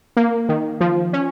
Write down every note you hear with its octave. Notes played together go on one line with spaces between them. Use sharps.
A#3
D#3
F3
C#4